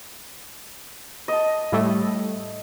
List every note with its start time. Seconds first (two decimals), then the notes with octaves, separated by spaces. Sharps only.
1.28 D#5 A5
1.72 A2 G3 A3